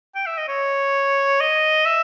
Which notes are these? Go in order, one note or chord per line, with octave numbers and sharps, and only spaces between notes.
G5
E5
D#5
C#5
D#5
E5